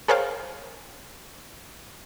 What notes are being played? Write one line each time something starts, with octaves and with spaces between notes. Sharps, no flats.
G#4 A#4 C5 C#5 F5 G5